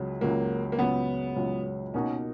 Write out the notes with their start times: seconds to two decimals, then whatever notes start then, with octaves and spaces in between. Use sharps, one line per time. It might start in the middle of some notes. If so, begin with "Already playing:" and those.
Already playing: C#2 C#3 F#3
0.21 C#2 C#3 F#3 A#3
0.72 A#3
0.79 C#2 C#3 F#3 B3
1.36 C#2 C#3 F#3
1.94 B2 A#3 C#4 D#4 F#4 A#4